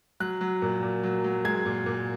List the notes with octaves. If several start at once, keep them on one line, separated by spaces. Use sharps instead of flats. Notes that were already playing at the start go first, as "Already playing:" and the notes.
F#3 F#6
F#3
A#2
A#2
F#3
F#3
G#3 G#6
A#2
A#2